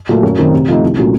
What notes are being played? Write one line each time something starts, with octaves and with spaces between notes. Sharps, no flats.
A#2 F#3 A3
F#2
D#3 A3 C4
C3
F3 A3 D#4
C2
A#2 F#3 A3 C#4